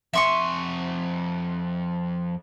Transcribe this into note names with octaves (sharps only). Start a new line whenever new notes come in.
F2 E5 G#5 C6 C#6